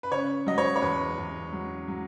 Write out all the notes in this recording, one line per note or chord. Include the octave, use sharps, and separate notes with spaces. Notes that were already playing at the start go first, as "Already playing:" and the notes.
B4
C#3 C#5
F#3 D#5
C#5
C#5
E2 B4
E2
F#3
F#3